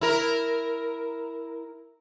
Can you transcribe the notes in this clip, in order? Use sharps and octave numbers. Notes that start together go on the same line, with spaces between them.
E4 A#4